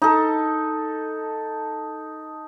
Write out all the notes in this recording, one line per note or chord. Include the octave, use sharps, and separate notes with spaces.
D#4 A4